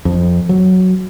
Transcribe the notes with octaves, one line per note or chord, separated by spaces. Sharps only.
F2
F#3